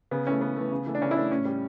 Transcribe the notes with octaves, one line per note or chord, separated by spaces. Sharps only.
C#3 B3
E3 A3 C#4
C#3 B3
E3 A3
C#3
E3 A3
D4
C#3 C#4
E4
E3 A3 D4
A2 C#4
G3